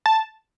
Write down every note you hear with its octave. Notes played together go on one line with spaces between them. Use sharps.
A5